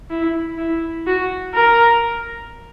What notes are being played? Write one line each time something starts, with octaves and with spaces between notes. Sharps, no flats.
E4
E4
F#4
A#4